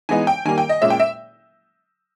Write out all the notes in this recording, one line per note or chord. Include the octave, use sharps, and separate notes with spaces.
E3 G#3 B3 D#4 G#5
G5
D#3 G3 A#3 G#5
G5
D#5
A#2 G#3 C#4 E5
G5
E5